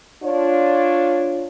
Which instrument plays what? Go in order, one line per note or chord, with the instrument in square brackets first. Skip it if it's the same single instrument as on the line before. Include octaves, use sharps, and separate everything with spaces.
[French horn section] D4 F4 C#5